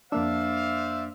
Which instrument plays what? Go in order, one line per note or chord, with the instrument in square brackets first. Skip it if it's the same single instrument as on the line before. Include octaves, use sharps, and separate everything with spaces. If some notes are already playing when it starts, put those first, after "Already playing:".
[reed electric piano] F2 A#3 D4 [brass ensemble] C5 D5 F5 [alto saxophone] E5